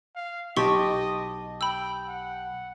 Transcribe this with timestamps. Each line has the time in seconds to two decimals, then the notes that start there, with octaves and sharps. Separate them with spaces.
0.16 F5
0.57 B1 G4 D#5 A5 C6 C#6
1.61 G5 B5 E6
2.08 F#5